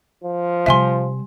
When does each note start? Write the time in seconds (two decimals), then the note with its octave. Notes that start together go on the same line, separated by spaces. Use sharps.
0.24 F3
0.66 C3 G3 E5 G#5 C6